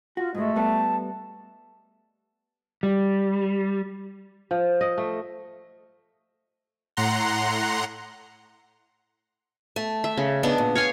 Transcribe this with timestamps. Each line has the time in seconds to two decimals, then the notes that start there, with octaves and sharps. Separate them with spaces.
0.17 F4 F#4
0.35 G#2 G#3 A3 D#5
0.56 G3 B3 A4 A5
2.83 G3
4.51 F3
4.81 D#5
4.98 A3
6.97 A2 F#5 A#5 C6
9.76 A3
10.04 E5
10.17 C#3
10.43 B3 D4 D#4
10.58 A#2
10.75 C#5 F5 G#5